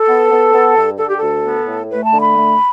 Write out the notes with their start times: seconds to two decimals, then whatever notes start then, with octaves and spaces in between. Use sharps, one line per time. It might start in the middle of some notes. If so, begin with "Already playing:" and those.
Already playing: A4
0.09 B3
0.32 B3
0.53 B3
0.77 G2
0.99 D3 A4
1.08 G4
1.17 A4
1.22 D2
1.44 B3
1.67 A2
1.90 A3 B4
2.04 A5
2.13 D3
2.20 B5
2.36 A3